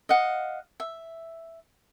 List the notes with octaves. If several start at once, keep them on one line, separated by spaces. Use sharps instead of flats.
D#5 F5 F#5
E5